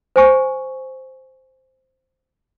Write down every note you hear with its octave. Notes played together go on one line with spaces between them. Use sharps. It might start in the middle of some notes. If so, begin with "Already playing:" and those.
C5 G#5 C#6